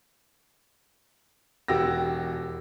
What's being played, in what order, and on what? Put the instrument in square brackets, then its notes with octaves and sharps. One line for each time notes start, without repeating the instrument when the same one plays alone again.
[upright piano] E1 F#4 G4 E6 A#6